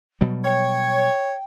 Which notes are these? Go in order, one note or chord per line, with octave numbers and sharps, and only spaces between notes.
B2 F#3 G3
C#5 G5